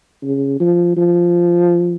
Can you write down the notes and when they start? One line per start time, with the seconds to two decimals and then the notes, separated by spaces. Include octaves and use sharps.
0.22 C#3
0.60 F3
0.97 F3